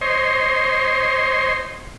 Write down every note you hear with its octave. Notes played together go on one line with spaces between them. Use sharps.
C5 C#5 D#5 C6